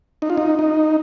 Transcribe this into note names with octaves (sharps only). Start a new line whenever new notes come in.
D#4
F4
D#4
D#4